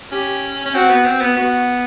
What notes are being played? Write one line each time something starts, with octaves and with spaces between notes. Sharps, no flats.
C#4 G4
C#4
C4 F#4
B3
C4
B3
B3 F#4